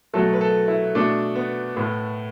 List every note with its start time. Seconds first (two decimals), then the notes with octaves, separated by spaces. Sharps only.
0.14 B2 F#3 A3 A4
0.33 B4
0.41 A4
0.68 E4
0.95 B2 A3 D4
1.35 B3
1.76 A2 A3 B3